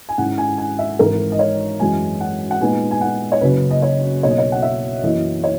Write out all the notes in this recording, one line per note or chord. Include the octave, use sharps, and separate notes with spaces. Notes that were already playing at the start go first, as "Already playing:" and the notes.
G#5
G#2 D#3 G#3 C#4 E4 F#5
G#5
G#5
E5
G#1 G#2 E3 A#4
D#5
C#5
F#2 E3 G#3 G#5
F#5
F#5
A#2 G#3 B3 D#4 G#5
G#5
F#5
C#5
F#1 F#2 C#3 B4
D#5
C#5
B1 B2 A#3 C#5
D#5
C#5
F#5
E5
F#2 E3 A#3 E4 D#5
C#5